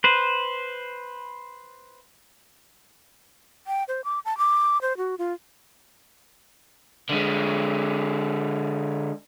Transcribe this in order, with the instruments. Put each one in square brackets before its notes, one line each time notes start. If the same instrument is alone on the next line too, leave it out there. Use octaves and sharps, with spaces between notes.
[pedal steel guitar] B4 C5
[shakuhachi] G5
C5
D6
A5
D6
C5
F#4
F4
[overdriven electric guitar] D3 G#3